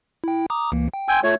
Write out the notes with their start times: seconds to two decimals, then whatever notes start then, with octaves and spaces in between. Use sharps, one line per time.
0.24 E4 G5
0.50 A#5 D6 D#6
0.72 C#2 E3 A#3
0.94 G5
1.08 G5 G#5 C6 E6
1.24 A3 F4 C#5